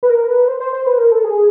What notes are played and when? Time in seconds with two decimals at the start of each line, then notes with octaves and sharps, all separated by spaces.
0.03 B4
0.10 A#4
0.29 B4
0.48 C5
0.60 C5
0.73 C5
0.86 B4
0.98 A#4
1.12 A4
1.24 G#4